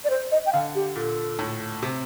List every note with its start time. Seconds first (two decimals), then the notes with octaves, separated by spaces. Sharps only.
0.04 D5
0.10 C5
0.32 D#5
0.46 G5
0.53 D3 F5
0.75 G4
0.95 A#2 A4
1.39 A2
1.82 C3